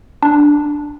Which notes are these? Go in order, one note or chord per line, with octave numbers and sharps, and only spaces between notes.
D4